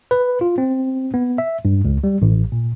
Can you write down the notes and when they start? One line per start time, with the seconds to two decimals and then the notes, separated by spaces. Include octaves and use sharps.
0.11 B4
0.41 F4
0.58 C4
1.14 B3
1.38 E5
1.65 G2
1.85 C#2
2.04 G3
2.22 A1
2.52 A#2